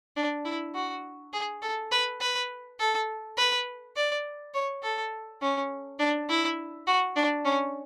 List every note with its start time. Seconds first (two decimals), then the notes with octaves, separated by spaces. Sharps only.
0.16 D4
0.45 E4
0.75 F#4
1.33 G#4
1.62 A4
1.92 B4
2.20 B4
2.79 A4
3.37 B4
3.96 D5
4.54 C#5
4.83 A4
5.42 C#4
5.99 D4
6.29 E4
6.87 F#4
7.16 D4
7.45 C#4